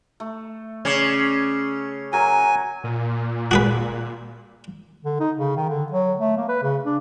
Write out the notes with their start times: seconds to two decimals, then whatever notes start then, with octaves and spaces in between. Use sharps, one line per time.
0.20 A3
0.85 C#3 C#4 D5
2.13 F#3 A#4 G#5
2.84 A#2
3.51 F#4 G#4 B4
5.05 D3
5.20 D#4
5.36 C#3
5.57 D#3
5.69 D3
5.92 F#3
6.19 A3
6.37 A#3
6.48 B4
6.63 C#3
6.84 D4